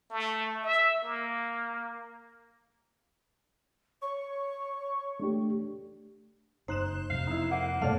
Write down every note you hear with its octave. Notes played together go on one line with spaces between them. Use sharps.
A3
E5
A#3
C#5 C#6
A3 D4 G4
F#1 D#4 C5 F#6 E7
F2 C3 F#3 F5
D#4 E4
A#3 F#5
G2 B2 A3 C#5 D5 F5 F6